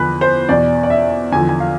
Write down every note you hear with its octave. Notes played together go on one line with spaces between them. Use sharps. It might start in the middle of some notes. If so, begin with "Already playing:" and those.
Already playing: E2 D3 F3 B4
C5
E2 B2 D5
D5
E5
E2 D3 F3 G#5
G#5
F5